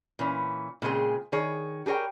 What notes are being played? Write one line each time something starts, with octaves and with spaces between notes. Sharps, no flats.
A#2 E3 C#4
A#2 C#3 G#3 C4 G#4
D#3 G#4 C#5
G4 G#4 A#4 C#5 G5